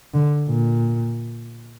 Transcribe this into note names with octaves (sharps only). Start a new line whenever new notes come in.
D3
A#2